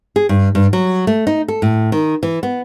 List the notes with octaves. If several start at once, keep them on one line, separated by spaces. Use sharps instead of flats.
G#4
G2
G2
F#3
A3
D#4
A4
A2
D#3
E3
B3